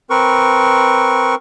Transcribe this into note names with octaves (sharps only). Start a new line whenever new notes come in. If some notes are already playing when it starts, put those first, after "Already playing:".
C4 A#4 B4 C#6